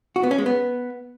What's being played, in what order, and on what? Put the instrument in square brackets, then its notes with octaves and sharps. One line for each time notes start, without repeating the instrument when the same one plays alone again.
[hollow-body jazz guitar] F#4
B3
C#4
G#3
B3